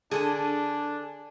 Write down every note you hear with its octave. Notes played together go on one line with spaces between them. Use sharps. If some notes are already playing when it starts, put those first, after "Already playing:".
D3 D4 G#4 A4 G#5